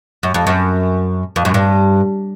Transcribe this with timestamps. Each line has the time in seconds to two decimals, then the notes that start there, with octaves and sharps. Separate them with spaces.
0.23 F#2
0.34 F2
0.47 F#2
1.36 F2
1.45 F#2
1.54 G2